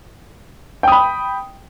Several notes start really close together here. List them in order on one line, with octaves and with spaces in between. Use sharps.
G5 D#6 B5